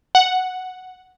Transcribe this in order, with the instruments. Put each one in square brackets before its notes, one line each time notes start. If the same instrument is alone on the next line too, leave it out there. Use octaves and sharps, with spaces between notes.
[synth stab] F#5